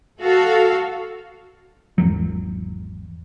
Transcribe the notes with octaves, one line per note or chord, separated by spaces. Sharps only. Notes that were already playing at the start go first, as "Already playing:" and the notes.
F#4 A4 F5
G#1 E2 F#3